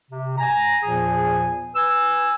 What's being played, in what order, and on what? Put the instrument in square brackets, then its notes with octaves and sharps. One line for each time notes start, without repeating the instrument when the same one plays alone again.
[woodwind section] C3
G#5 A#5
E2 A#2 F3 G#4 G#5
B4 G#5 E6